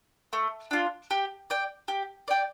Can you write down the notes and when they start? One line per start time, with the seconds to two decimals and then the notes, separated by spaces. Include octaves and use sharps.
0.33 A3
0.71 D4 F4
1.11 G4
1.50 D5 G5
1.88 G4
2.28 D5 G5